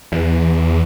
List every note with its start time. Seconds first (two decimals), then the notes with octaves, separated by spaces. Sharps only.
0.12 E2